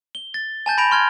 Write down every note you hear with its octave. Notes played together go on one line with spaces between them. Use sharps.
G7
A6
G#5 A5 G6 A6
B5 G6 A#6 D7 F7
C6 F6 G#6